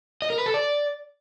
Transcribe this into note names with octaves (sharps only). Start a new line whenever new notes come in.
D#5
A#4
B4
A4
D5